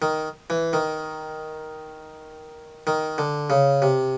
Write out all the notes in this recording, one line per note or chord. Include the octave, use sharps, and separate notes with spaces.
D#3
E3
D#3
D#3
D3
C#3
C3